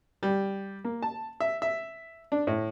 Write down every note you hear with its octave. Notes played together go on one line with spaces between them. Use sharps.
G3
A#3
A5
E5
E5
D4
A2